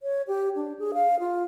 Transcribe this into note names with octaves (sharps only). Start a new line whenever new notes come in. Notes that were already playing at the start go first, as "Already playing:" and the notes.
C#5
G4
D4
G#4
F5
F4